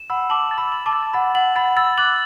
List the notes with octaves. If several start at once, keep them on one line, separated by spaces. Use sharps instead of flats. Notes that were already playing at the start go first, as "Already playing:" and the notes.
Already playing: E7
F#5 B5 E6
A5 D6 F#7
A6
B5 E6
F#7
A5 D6
A6
F#5 B5 A6
F#5 F#7
F#5 B5 A6
B5 E6 A6
D6 F#6 F#7